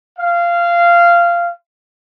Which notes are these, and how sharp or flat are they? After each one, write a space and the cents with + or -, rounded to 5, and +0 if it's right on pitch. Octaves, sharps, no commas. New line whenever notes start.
F5 -15